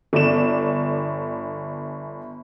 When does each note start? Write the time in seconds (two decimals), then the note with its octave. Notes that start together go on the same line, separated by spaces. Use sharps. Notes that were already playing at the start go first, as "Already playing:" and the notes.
0.13 G1 D5 E7